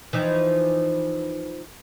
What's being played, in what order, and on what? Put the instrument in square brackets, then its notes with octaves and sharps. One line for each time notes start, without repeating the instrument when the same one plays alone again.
[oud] E3 F3 D#4